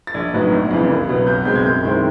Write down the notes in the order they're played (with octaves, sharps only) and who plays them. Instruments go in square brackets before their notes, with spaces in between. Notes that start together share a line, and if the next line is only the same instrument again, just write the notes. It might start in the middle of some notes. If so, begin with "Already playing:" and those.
[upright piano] A6
A#1 G#6
A2 F#3 B3 D#4
G1
F2 C#3 E3
C2
B2 F#3 B3
B1 G6
B2 G#3 C4 G6
G#6
F#2 G6
D#3 G#3 C4 E4